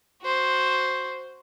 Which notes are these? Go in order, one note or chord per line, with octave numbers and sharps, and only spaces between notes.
F#4 C5